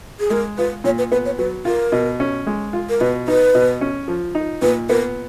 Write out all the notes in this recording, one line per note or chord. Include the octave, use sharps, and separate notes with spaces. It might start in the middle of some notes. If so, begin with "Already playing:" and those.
G#4
G#3 A#4
F4 B4
A#2 C#5
B4
B3 B4
C#5
F#3 B4
F4 A#4
B2
C#4
G#3
F4
A#4
B2 B4
D#4 B4
B2
C#4
F3
D#4
A#2 B4
B3 A#4